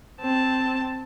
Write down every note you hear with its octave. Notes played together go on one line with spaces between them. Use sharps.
C4 A5